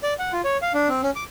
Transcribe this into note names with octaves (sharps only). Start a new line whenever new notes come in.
D5
F#5
F4
C#5
F5
D4
C4
C#4
D6